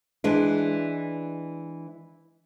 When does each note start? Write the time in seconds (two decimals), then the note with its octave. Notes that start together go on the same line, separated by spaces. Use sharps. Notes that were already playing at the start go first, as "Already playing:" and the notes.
0.24 E3 G#3 D4